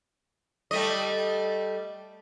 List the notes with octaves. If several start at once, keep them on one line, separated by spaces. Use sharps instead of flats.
G3 A3 D#5